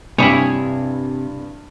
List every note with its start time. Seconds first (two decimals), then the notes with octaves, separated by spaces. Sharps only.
0.18 G2 C3 G3 E4 G#4 C#5